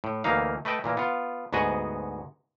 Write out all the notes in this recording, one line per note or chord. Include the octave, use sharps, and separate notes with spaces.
A2
D2 E3 A#3 D#4 F5
A3 B4 D#5 G5 A5
A#2 E3 A#3
B3 F4
D2 G#2 B3 F#4 G#4 D#5